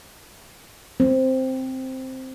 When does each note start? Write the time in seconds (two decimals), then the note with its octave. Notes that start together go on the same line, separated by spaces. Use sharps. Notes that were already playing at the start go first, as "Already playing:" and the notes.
1.00 C4